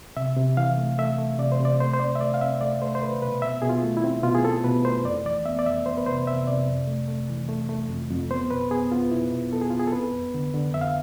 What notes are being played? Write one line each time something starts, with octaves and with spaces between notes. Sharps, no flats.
C3 E5
C3
E3 F5
A3
A3 E5
A3
C3 D5
C5
C3 D5
A3 C5
C5
C4 D5
E5
A3 D5
F5
C4 E5
A3 D5
A3 C5
C5
A3 B4
B2 B4
B2 E5
B2 G#4
F4
A3
E4
C4
B2 F4
G#4
C4 A4
B2 B4
A3 C5
F2 D5
E3 D5
B3 E5
D5
F2 E5
B3 C5
B4
C3 C5
C3 E5
C3 D5
F2
A3
A3
E3
A3
A3
F2
F2
B3 C5
B2 B4
B3 G#4
B3 F4
B2 E4
B2
B3 A4
G#4
B3 F4
G#4
A4
C4 B4
F2
D3
D3
F2 E5
F5